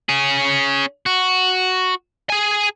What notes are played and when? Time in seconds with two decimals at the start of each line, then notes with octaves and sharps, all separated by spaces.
0.09 C#4 G#4
1.06 F#4
2.30 G#4 G#5